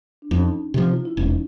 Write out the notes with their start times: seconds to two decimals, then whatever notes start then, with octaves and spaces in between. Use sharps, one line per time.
0.22 D4
0.31 F2 C#4 D#4
0.74 C3 F3
0.93 F4
1.05 E4
1.17 E1 C#4 D#4